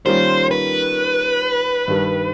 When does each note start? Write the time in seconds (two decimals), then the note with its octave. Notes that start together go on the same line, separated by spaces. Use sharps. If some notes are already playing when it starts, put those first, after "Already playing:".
0.06 D#3 G3 A#3 C#4 F4 C5
0.51 B4
1.88 G2 D#3 G3